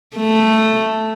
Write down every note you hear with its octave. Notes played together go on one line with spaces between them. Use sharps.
A3